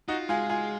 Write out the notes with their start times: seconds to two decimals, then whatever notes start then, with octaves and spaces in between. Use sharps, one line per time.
0.08 D#4 F4 F#4
0.29 G#3 F4 G#4
0.49 F4 G#4